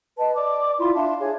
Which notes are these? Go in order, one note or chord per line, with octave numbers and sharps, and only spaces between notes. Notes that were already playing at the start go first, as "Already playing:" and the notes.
B4 D#5 A5
D5 D6
E4 F4 B5 C6
D4 E5 F5 A5
G#4 C#5